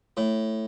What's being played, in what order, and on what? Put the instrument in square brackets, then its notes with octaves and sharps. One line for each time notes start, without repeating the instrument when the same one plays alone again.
[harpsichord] A2